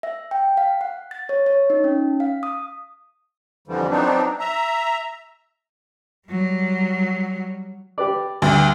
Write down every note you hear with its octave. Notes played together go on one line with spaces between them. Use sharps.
E5
G5
F5
F#5
A6
C#5
C#5
D#4
C#4
F5
D#6
F2 D3 E3 F3 G3
F3 F#3 B3 C4 D4 D#4
E5 A#5
F#3 G3
G4 B4 D5
D2 G2